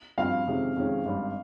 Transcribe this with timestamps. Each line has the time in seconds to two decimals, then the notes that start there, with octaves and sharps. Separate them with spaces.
0.18 G2 F3 C4 F5
0.47 F2 C3 D#3 G#3 C#4
0.76 F2 C3 D#3 G#3 C#4
1.05 G#1 G2 G3